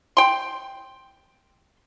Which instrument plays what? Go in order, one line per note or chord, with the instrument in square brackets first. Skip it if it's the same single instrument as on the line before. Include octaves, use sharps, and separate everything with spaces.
[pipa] G5 C6